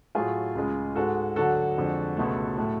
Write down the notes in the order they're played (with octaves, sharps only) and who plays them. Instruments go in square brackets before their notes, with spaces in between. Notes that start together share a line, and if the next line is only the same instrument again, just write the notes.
[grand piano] A2 F#3 A3 F4 G#4
C#2 C#3 G#3
G#2 G#3 F#4 A4
D2 D3 F#3 F#4 A4
F2 D3 G#3
C#2 B2 A3
A2 F#3 A3